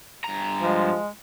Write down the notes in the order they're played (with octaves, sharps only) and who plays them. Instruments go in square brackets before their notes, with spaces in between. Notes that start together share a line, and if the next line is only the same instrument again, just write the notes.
[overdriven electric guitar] G2 A#5
[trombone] F3 [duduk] G#3